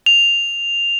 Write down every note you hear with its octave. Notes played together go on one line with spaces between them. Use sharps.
F7